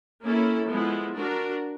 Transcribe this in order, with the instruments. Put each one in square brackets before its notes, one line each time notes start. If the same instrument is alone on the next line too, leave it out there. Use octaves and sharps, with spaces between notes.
[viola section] A#3 C#4 E4 A4
F3 G#3 B3 E4
D4 F#4 A#4